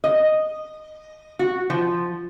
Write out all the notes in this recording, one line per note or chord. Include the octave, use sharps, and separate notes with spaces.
D#5
F#4
F3